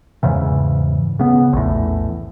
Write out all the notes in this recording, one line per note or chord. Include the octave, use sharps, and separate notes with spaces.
E2 G#2 C#3 E3
C#3 B3
A#1 E2 A2